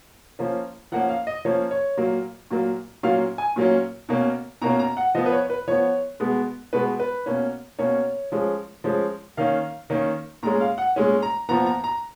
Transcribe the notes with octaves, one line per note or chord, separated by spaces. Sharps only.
F3 A#3 C#4
F3 A#3 C#4 F#5
F5
D#5
F3 A#3 C#4 C#5
C#5
A#2 F#3 A#3
A#2 F#3 A#3
A#2 F#3 A#3 C#4 F5
G#5
A#2 F#3 A#3 C#4
B2 A#3 C#4
B2 A#3 C#4 A#5
A#5
F#5
F3 B3 D#5
B4
C#5
B4
F3 B3 C#5
B2 G#3 B3
B2 G#3 B3 B4
B4
B2 A#3 C#4
B2 A#3 C#4 C#5
F3 G#3 C#4
F3 G#3 C#4
D#3 A#3 C#4 F5
D#3 A#3 C#4
A#2 G#3 C#4 A#5
F5
F#5
A#2 G#3 C#4
A#5
A#2 F3 B3 A#5
A#5
A#5